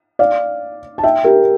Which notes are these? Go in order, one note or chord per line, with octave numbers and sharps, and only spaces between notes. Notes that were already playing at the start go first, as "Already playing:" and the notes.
D5 F5
A5
E5 G5
G4 A#4